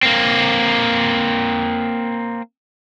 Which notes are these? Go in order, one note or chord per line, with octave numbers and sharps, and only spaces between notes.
A#3 C4